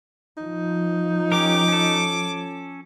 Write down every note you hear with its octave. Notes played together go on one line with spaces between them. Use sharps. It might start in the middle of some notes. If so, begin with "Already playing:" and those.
F3 D#4
C#4 G4 A#4 D6
C#4 A4